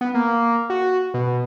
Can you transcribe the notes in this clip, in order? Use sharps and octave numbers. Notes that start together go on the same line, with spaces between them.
B3
A#3
F#4
B2